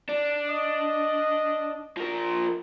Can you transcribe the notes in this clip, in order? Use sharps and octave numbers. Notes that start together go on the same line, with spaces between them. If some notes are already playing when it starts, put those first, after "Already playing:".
D4
D#5
F3 A#4